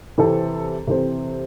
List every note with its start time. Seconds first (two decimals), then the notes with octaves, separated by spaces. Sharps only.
0.18 C3 E3 C4 A4 C5
0.87 C3 E3 C4 A4 C5